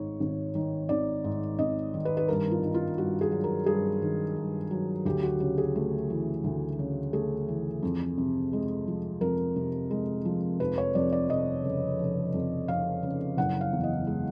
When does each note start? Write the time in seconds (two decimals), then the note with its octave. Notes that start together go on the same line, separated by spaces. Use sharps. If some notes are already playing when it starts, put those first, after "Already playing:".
Already playing: G#1 G#2 C#5
0.20 G#1
0.55 D#3
0.89 G#1 D5
1.24 G#2
1.59 G#1 D#5
1.94 D#3
2.05 B4
2.17 B4
2.28 G2 A#4
2.51 F4
2.63 D#3
2.74 F4
2.98 G2 F#4
3.21 G#4
3.32 F#3
3.44 A#4
3.66 G2 G#4
4.02 D#3
4.36 G2
4.71 F#3
5.05 D2 G4
5.23 F#4
5.40 C#3 G4
5.58 G#4
5.76 A3
6.10 E3
6.44 D2
6.79 C#3
7.13 A3 G#4
7.48 E3
7.83 F2
8.18 C3
8.53 G#3
8.88 F3
9.21 F2 A#4
9.56 C3
9.91 G#3
10.25 F3
10.60 F1 B4
10.78 C#5
10.95 F2 D5
11.13 D5
11.30 F1 D#5
11.64 C#3
11.99 F1
12.34 F2
12.68 F1 F5
13.03 C#3
13.37 F#1 F#5
13.61 F5
13.73 E2
13.83 D#5
14.07 G#3